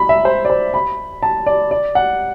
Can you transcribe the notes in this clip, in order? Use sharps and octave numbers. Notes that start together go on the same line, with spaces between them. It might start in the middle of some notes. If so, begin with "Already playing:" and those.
Already playing: B5
E5
C5
D5
C5
B5
A5
D5
D5
F#5